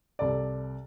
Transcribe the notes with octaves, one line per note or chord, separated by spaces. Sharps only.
C2 A4 D5